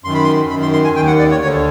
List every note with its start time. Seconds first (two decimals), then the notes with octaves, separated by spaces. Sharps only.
0.04 F#2 D#3 C6
0.14 B5
0.24 C6
0.50 F#2 B5
0.54 D#3
0.62 C6
0.73 C6
0.84 G#5
0.95 D#3 G5
1.00 D#2
1.07 F#5
1.19 D5
1.31 C#5
1.41 D2 C#5
1.45 D3